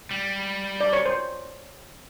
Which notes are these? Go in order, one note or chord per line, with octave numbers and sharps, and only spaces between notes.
G3
D5
C#5
C5